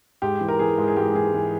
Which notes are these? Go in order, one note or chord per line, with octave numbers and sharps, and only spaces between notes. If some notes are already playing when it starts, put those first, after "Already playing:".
G#2 G4
E3
A#4
E3 G#4
G#2
G#4
G#2 G4
E3 G#4
E3